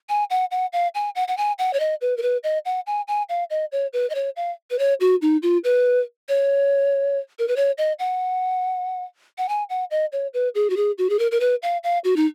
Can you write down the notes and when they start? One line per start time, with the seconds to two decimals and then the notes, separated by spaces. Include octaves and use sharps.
0.09 G#5
0.30 F#5
0.51 F#5
0.73 F5
0.95 G#5
1.15 F#5
1.28 F#5
1.37 G#5
1.59 F#5
1.73 C#5
1.80 D#5
2.01 B4
2.17 A#4
2.22 B4
2.43 D#5
2.65 F#5
2.87 G#5
3.08 G#5
3.29 F5
3.50 D#5
3.72 C#5
3.93 B4
4.10 D#5
4.15 C#5
4.36 F5
4.70 B4
4.79 C#5
5.00 F#4
5.22 D#4
5.43 F4
5.64 B4
6.29 C#5
7.39 A#4
7.48 B4
7.56 C#5
7.78 D#5
7.99 F#5
9.38 F#5
9.49 G#5
9.70 F#5
9.91 D#5
10.12 C#5
10.34 B4
10.55 G#4
10.70 F#4
10.77 G#4
10.98 F#4
11.10 G#4
11.19 A#4
11.31 A#4
11.40 B4
11.63 F5
11.84 F5
12.04 F#4
12.16 D#4